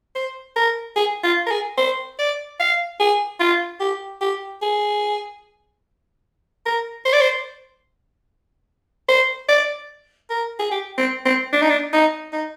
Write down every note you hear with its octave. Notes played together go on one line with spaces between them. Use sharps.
C5
A#4
G#4
F4
A#4
G#4
C5
D5
F5
G#4
F4
G4
G4
G#4
A#4
C5
D5
C5
C5
D5
A#4
G#4
G4
C4
C4
D4
D#4
D4
D#4
D#4